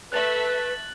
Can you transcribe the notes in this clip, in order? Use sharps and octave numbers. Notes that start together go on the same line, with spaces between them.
A3 B4 E5 F#6 A6 F#7